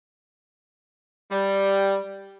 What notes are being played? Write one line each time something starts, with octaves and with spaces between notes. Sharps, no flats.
G3